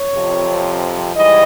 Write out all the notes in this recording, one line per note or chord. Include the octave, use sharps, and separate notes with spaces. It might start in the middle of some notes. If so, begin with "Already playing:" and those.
Already playing: C#5
F2 C3 F3
G#2 E3 G3 D#5